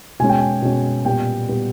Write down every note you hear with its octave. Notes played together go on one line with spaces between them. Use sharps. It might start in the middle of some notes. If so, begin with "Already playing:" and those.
B2 G#3 C#4 G#5
G5
G#5
B2 G#3 C#4
A#2 G3 B3 G5
A#2 G3 B3